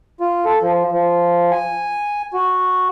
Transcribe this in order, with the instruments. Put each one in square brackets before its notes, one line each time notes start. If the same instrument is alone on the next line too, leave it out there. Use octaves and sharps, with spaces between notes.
[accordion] F4
A4
F3
F3
G#5
F#4